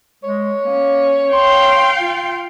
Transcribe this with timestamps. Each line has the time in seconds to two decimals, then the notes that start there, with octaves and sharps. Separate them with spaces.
0.24 G#3 C#5
0.64 A#3 C#4
1.33 F5 G5 C6
2.00 F4